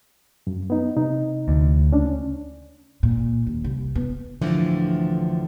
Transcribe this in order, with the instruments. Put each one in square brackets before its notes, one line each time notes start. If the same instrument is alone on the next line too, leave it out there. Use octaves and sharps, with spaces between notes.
[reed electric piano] F#2
B3 D#4
C3 D#4
[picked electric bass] D2
[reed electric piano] C#2 C#4 D4
[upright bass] A#2
D#2
C2
B3
[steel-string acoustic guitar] D2 A2 D3 E3 F3 D4